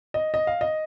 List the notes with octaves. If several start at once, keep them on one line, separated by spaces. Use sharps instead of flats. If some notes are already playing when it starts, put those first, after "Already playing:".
D#5
D#5
F5
D#5